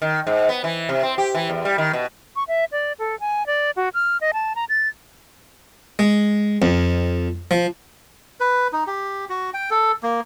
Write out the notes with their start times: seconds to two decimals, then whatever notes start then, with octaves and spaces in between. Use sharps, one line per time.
0.02 D#3
0.27 G#2
0.49 B3
0.64 E3
0.89 C3
1.03 C4
1.18 G4
1.35 E3
1.50 E2
1.65 G3
1.78 D#3
1.93 B2
2.36 C#6
2.48 E5
2.72 D5
2.99 A4
3.20 G#5
3.47 D5
3.76 F#4
3.94 F6
4.21 D#5
4.34 A5
4.56 A#5
4.69 A6
5.99 G#3
6.62 F2
7.51 F3
8.40 B4
8.73 D#4
8.87 G4
9.29 F#4
9.54 G5
9.71 A4
10.03 A#3